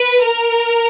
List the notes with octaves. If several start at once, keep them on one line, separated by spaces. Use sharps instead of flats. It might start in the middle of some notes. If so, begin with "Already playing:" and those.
Already playing: B4
A#4